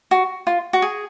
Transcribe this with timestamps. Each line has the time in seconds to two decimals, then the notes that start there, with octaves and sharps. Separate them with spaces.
0.11 F#4
0.47 F4
0.73 F#4
0.82 G#4